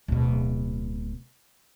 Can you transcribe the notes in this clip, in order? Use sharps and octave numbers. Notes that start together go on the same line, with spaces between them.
D1 B2